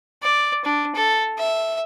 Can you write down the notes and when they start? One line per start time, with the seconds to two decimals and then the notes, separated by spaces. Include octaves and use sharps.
0.23 D5
0.65 D4
0.95 A4
1.38 E5